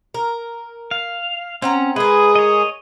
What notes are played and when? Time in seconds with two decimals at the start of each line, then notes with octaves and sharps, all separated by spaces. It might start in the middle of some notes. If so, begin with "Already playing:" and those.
0.14 A#4
0.91 F5
1.62 C4 C#4 F#5 A#5
1.96 G#3 G#4 A#4 B4
2.35 C#5 D#5